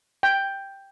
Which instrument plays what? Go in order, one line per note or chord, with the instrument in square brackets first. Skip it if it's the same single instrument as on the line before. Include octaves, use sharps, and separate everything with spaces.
[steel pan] G5